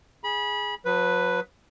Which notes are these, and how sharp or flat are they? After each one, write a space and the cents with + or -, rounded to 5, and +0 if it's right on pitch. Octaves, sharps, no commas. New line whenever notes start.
G#4 +0 B5 -25
F#3 -45 B4 +0